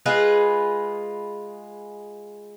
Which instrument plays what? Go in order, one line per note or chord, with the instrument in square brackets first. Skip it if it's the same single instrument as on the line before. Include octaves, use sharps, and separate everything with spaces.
[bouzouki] G#3 F4 G#4 B4